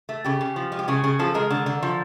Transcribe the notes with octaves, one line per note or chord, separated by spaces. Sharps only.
A3
C#3 G4
C#3
F3
G#3
G4
C#3 G#4
C#3 G#4
F3 A4
G#3 A#4
D3
D3
F3